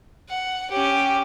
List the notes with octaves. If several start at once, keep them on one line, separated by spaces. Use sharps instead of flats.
F#5
C#4 G4